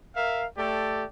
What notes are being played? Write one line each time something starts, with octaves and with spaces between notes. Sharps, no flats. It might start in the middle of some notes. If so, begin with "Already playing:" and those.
A#4 E5 F5
A3 G4 A4 D5